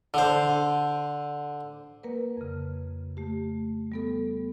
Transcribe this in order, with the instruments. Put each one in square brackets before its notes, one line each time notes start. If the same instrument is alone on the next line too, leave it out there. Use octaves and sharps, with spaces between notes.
[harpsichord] D3 C5
[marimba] A#3 A#4 B4
F2 C#3
A3 G4
G3 B3 A4